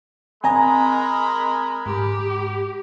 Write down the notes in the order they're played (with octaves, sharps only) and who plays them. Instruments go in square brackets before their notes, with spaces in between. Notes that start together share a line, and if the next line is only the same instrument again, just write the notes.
[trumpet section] G#3 A#4 B5 [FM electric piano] C4 D#5 [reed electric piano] G#5 A#5
[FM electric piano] G#2 [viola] G4